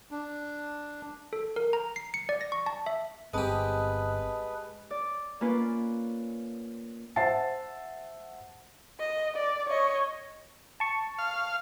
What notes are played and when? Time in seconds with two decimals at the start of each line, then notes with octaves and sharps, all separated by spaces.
0.11 D4
1.33 A4
1.56 A#4
1.73 A#5
1.96 C7
2.14 C#7
2.29 D5
2.41 A#6
2.52 C#6
2.66 A5
2.86 E5
3.34 G1 G#3 C4 G4 B4 D#5 A5 D#6
4.91 D5
5.41 A#3 C#4 F4 B4 D5
7.16 C5 E5 F#5 A5 A6 C7
9.00 D#5
9.36 D5
9.69 C#5 D#5
10.80 A5 C#6
11.19 F5